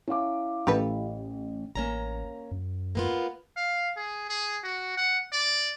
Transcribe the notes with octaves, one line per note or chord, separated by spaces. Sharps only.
C#4 E4 F5 D6
A1 G4 A4 B4
A1 A#3 C#4 A#5
F#2
A#3 B3 F4
F5
G#4
G#4
F#4
F#5
D5